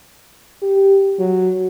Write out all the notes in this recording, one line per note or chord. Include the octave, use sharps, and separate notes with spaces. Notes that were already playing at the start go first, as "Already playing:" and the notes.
G4
F#3